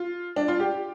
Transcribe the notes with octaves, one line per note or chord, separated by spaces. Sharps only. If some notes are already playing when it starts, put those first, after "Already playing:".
Already playing: F4
D4
F4
G4